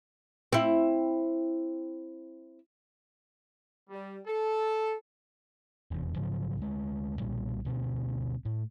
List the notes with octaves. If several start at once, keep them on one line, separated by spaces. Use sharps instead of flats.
C4 E4
G3
A4
F1 E2
G#2 C#3 F3 F#3
D2 G#3
B1 A#2 G3
D2 B2 C4
A2